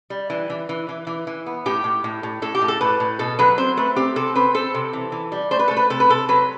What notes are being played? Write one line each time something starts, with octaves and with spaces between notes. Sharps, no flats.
G3
E3
E3
E3
E3
E3
E3
B3
A2 G4
A2
A2
A2
A2 A4
G4
A2
A4
A2 B4
A2
B2 A4
F#3 B4
C4 C5
A3 B4
C4 G4
C3 A4
C4 B4
C4 A4
C3
E3
E3
G3
A3 C5
B4
A3 A4
B4
C3 A4
B4
C3 A4
F#3 B4